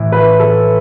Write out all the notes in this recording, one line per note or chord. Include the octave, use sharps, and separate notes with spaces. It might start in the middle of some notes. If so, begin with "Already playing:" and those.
Already playing: A2 E3
B4
A4